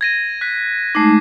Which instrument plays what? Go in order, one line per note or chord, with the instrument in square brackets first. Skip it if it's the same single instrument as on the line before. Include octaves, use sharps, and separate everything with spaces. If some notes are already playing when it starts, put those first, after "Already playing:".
[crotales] G#6 A#6 D#7
F#6 B6
[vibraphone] G#3 A3 D#4 [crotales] D6 C7